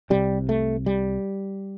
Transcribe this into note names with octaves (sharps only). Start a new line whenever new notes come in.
C2 C3 G3
A3
G3